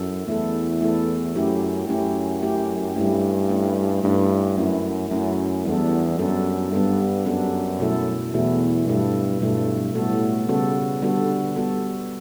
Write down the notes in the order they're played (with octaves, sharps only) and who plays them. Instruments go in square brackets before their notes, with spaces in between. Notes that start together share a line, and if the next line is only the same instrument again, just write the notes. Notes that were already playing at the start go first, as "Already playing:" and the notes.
Already playing: [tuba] F#2 [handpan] E4 A4
[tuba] E2 [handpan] A3 E4 A4
[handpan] A3 E4 A4
[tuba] F#2 [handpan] A3 C#4 E4 G4
[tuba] F#2 [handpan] A3 C#4 E4 G4
[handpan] A3 C#4 E4 G4
[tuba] G2 [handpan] A3 C#4 E4 G4
[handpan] A3 C#4 E4
[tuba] G2 [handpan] A3 C#4 E4
[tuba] F#2 [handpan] A3 C#4 E4
[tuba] F#2 [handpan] A3 C#4 E4
[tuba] E2 [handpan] G3 B3 D4 A4
[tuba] F#2 [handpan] G3 B3 D4 A4
[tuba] G2 [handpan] G3 B3 D4 A4
[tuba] F#2 [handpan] G3 B3 D4 A4
[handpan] B2 F#3 A3 E4 A4
[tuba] E2 [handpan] B2 F#3 A3 E4 A4
[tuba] G2 [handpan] B2 F#3 A3 E4 A4
[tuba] G2 [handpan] B2 F#3 A3 E4 A4
[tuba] A2 [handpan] G3 B3 F#4 A4
[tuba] C#3 [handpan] G3 B3 F#4 A4
[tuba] D3 [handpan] G3 B3 F#4 A4
[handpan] G3 B3 F#4 A4